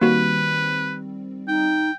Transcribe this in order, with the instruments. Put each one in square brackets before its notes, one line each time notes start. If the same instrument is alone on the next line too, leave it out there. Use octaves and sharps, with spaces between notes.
[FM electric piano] D#3 G3 C4 [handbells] A#3 F#4 [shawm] B4
[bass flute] D#4 [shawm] G5